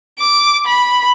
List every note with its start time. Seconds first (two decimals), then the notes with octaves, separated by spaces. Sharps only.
0.19 D6
0.67 B5